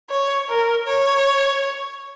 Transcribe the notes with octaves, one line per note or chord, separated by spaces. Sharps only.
C#5
A#4
C#5